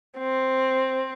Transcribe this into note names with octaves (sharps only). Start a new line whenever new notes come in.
C4